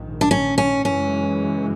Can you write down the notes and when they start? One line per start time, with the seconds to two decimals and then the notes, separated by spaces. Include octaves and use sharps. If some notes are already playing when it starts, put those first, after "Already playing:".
Already playing: A#1 G#2 D#3
0.21 D4
0.31 C#4
0.58 C#4
0.85 F#2 C#3 E3 G#3 C#4